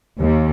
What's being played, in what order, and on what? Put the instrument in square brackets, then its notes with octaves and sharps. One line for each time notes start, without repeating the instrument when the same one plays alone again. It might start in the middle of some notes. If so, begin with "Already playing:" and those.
[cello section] D#2